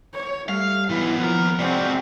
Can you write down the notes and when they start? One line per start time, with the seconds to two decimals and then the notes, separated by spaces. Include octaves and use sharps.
0.14 C#5
0.49 G3 A3 F5
0.89 B1 E3 B3 E4
1.18 D#2 F3 A#4
1.59 C3 G#3 C4 F#4 D5